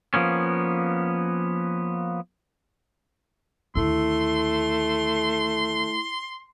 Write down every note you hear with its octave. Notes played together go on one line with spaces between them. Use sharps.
F3 A#3 B3 C#4
D#2 D3 A3 E4 C6